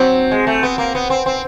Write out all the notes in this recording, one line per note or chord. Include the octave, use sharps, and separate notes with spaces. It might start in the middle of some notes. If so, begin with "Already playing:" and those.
Already playing: F#3 C4
G#3
A3
B3
A#3
B3
C4
C4